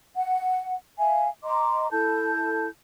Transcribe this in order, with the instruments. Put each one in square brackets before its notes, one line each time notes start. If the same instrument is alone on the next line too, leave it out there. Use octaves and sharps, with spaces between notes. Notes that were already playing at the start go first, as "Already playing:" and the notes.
[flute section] F#5
E5 F5 G#5
D#5 A#5 C6 D6
E4 A4 A5 G6